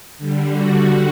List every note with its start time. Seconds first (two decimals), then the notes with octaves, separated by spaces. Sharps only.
0.18 D3 G3
0.52 F#4